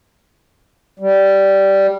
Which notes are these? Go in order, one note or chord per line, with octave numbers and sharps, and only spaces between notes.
G3